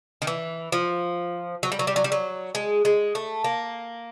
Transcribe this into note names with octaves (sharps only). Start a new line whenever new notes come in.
D#3
E3
F3
F#3
G3
F#3
G3
F#3
G3
F#3
G#3
G#3
A3
A#3